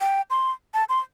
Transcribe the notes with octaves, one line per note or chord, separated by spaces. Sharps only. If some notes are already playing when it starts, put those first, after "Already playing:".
G5
C6
A5
C6